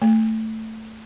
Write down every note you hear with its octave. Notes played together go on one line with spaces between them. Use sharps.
A3